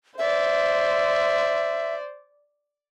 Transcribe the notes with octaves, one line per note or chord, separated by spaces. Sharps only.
C5 D5 E5